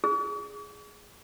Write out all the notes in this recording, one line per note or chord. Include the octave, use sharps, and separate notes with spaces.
G#4